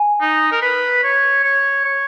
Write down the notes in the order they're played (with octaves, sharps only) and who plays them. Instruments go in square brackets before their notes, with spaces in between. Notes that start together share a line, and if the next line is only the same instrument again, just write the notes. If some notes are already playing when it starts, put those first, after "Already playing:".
Already playing: [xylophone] G#5
[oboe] D#4
A#4
B4
C#5
C#5
C#5